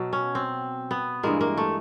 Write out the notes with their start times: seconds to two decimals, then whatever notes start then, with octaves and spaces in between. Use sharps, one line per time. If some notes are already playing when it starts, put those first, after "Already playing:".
Already playing: B2 F#3
0.13 C#4
0.35 C4
0.91 B3
1.23 G2 E3 G#3 A#3
1.41 A#3
1.57 A3